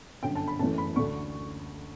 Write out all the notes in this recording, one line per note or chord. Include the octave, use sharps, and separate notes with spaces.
G1 F#2 D3 G5
A5
B5
F#1 F#2 E3 A3 A5
B5
D2 D3 A3 D4 C#6